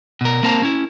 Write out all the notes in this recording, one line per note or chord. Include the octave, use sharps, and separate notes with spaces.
B2 A#4
A#3 C4 A#4 C5 A5 A#5
C#4 E4